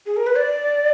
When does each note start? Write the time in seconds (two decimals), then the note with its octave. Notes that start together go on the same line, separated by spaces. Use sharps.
0.06 G#4
0.17 A#4
0.26 B4
0.37 D5